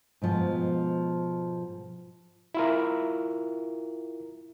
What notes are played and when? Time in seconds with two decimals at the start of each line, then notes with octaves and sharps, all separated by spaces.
0.22 G#2 B2 F3
2.55 E4 F4 A#4